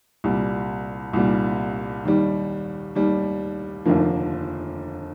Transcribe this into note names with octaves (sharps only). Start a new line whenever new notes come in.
C2 A#2 G3
C2 A#2 G3
D#2 D#3 G3
D#2 D#3 G3
F1 D#2 D3 F3 A#3